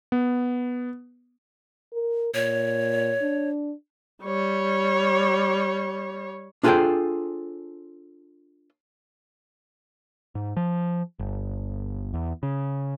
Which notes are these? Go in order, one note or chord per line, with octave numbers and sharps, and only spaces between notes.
B3
A#4
A#2 C#5
D4
G3 C#5
D4 F4 G#4 A4 C5 G5
G#2
F3
G1
E2
C#3